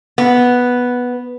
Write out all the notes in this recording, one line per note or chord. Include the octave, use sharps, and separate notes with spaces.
B3